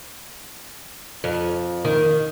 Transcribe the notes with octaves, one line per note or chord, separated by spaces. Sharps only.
F2
D#3